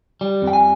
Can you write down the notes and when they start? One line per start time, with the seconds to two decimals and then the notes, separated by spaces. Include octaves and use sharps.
0.21 G3
0.42 F2
0.47 G5
0.53 G#5